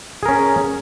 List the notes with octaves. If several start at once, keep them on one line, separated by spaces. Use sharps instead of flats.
C#4 G#4 A#4